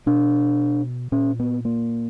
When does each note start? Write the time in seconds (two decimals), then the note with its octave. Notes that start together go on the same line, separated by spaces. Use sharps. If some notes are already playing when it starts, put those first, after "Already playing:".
0.06 B2 D4
1.12 A#2 C#4
1.39 B3
1.65 A#3